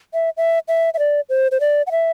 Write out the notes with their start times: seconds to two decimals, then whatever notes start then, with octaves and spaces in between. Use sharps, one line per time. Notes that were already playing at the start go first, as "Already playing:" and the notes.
0.14 E5
0.37 E5
0.68 E5
0.94 E5
0.99 D5
1.30 C5
1.52 C5
1.60 D5
1.87 F#5
1.91 E5